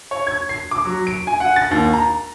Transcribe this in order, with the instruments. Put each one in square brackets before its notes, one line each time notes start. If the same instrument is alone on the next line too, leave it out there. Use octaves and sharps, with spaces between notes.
[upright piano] C#5
G#6
C7
D6
F#3
D7
G#5
F#5
A6
D#2
A#5